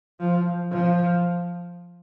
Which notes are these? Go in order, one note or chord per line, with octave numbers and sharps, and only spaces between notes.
F3
F3